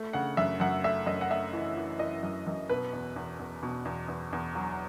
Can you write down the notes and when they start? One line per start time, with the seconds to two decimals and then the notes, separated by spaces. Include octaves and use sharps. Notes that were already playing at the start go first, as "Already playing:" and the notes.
Already playing: A3
0.13 C#3 F#5
0.37 F#2 E5
0.60 F#2 F#5
0.84 A3 E5
1.06 F#2 D#5
1.21 F#5
1.31 A3 E5
1.53 E3
1.77 E3
1.99 E3 D#5
2.23 F#2
2.47 F#2
2.69 B2 B4
2.93 E2
3.16 E2
3.39 E2
3.63 B2
3.85 E2
4.08 E2
4.33 E2
4.55 F#3